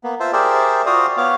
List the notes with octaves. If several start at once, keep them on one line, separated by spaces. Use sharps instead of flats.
A#3 B3
F4 C5 E5 A5
G4 G#4 A#4 C5 D5 E5
F4 F#4 C5 D5 F5 D#6
B3 C#5 F5 D6